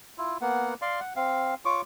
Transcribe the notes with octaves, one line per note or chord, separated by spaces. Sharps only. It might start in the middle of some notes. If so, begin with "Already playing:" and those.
E4 F4
A#3 B3 F#5
D5 F5 C6
F#5
C4 F5
F4 C#5 C#6 D6